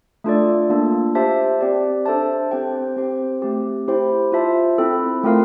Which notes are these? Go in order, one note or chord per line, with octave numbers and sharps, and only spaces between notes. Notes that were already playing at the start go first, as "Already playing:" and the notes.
A3 D4 F4 A4 D5
A#3 D4 F4
G4 C5 E5 A5
C4 G4 D5
D4 A4 C5 E5 A5
C4 G4 C5 G5
C4 G4 C5 G5
A3 C4 G4
E4 G4 C5 G5
F4 C5 E5 A5
C4 E4 A4
A3 C4 F4 A#4 F5